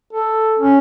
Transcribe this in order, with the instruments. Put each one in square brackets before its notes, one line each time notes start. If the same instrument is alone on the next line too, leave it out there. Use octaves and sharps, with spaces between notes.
[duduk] A4
C#4